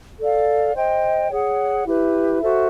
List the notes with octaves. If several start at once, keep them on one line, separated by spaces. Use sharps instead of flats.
A4 D5 F5
C5 D#5 G5
G#4 C#5 F#5
E4 G4 B4
F#4 A4 C5 E5